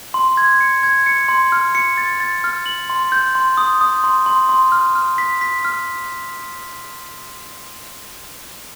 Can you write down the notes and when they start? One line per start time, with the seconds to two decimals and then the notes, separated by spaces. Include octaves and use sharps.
0.14 C6
0.37 G#6
0.60 C#7
0.83 G#6
1.06 C#7
1.28 C6
1.52 F6
1.75 C#7
1.97 A6
2.20 A6
2.44 F6
2.66 F#7
2.90 C6
3.12 G6
3.35 C6
3.57 D#6
3.81 D#6
4.04 C6
4.26 C6
4.49 C6
4.72 F6
4.95 F6
5.18 B6
5.41 B6
5.65 F6